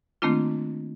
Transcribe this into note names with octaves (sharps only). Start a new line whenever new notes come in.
D#3 A3 A#3 C4 D4 F4